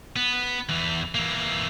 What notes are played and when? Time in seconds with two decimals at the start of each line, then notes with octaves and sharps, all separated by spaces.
0.16 B3
0.69 E2 E3
1.15 E3 A#3